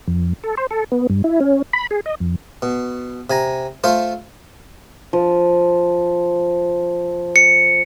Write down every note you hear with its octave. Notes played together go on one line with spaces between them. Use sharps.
F2
A4
C5
A4
B3
G2
E4
C#4
B5
G#4
D#5
F2
B2
C3 G#5 A#5
A3 F4 C5
F3
C#7